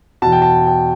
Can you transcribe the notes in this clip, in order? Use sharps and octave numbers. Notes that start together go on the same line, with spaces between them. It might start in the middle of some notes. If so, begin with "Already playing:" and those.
E2 B2 A5
G5
A5
G5